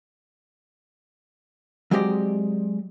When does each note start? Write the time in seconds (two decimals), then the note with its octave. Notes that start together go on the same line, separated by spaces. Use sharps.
1.91 F#3 G#3 C4 G4 D5 D#5